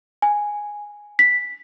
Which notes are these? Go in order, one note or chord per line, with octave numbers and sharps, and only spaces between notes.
G#5
B6